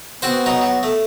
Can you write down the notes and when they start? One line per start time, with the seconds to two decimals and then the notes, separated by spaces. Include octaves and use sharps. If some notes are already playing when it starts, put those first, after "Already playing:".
0.22 B3 C4 F#4 C5
0.46 F#3 D#4
0.61 F#3
0.83 A3